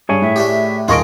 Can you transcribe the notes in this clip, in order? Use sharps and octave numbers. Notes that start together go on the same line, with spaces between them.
G2 G#4 C#5 G#5
A2 E5
A3 D4 G4
D#1 F4 G#4 A#4 D#5 C#6 D7